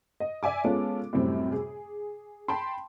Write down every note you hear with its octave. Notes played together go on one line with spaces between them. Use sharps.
D#5
D5 E5 G#5 D6
G#3 B3 C#4 F4 A4
F#2 A2 C3 G3 C4
G#4
G5 A5 B5 C6